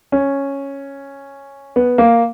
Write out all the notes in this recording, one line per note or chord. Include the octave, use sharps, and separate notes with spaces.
C#4
B3
A#3